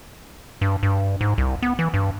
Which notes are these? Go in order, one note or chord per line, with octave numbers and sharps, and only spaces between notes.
G2
G2
G#2
C2
B3
E3
G2